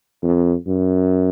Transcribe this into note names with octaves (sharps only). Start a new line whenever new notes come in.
F2
F#2